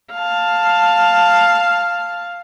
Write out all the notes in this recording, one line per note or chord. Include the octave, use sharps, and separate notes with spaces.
F5 A5